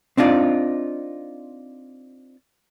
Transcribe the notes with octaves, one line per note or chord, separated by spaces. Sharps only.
C4 D4 D#4 F4 D5